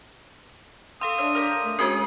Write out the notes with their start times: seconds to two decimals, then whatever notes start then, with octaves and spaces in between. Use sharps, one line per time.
1.01 A4 F5 C6 D#6 E6
1.18 D4 C#5 E5
1.35 G4 A#4
1.64 A3
1.79 G#3 C#4 F#4 G#4 A#4 D#6